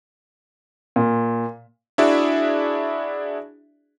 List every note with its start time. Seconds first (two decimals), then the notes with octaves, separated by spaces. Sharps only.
0.96 A#2
1.98 D4 E4 F#4 G#4 D5 E5